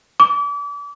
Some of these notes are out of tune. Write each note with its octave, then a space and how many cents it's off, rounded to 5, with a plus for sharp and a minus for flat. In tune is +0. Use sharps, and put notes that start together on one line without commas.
D6 -35